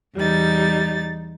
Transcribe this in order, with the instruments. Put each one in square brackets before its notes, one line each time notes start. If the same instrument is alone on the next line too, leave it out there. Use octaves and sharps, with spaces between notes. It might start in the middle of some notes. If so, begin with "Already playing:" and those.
[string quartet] E2 G3 D#4 A6